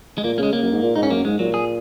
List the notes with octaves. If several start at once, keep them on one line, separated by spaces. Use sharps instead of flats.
G#3
A#2 A#3
C#3 G#3 A#3
C#3 A#3
F#2
G#2
A#2
G#2 D#4
C#4
F#2 A#3
G#2 G#3
A#2 F#3
G#4